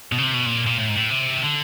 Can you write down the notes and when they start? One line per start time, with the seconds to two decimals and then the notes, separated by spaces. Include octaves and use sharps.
0.12 B2
0.18 C#3
0.23 C3
0.34 B2
0.46 A#2
0.66 A#2
0.78 A2
0.89 G#2
0.95 A2
1.10 C3
1.37 D#3
1.43 D3